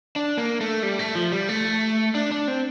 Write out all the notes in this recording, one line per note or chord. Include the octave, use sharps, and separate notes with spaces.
D4
A#3
A3
G3
A3
F3
G3
A3
D4
D4
C4